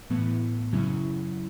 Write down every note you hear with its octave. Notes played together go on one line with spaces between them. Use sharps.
A2 E3 B3
F#2 C#3 F#3 C#4 E4